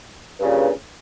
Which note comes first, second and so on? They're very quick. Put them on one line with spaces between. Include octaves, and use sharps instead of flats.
G2 C#3 A#2